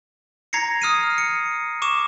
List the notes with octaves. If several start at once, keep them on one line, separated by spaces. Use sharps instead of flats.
A#5 G#6 A#6 C7 C#7
D#6 F6 C7 D#7
C#7
C#6 D6 E7